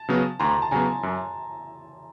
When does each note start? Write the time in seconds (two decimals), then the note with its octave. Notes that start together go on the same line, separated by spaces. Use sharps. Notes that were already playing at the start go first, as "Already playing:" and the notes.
Already playing: A5
0.09 C#3 F#3 B3
0.40 D2 A#5 C6
0.62 A5
0.71 C#3 F#3 B3 G#5 A#5
1.03 F#2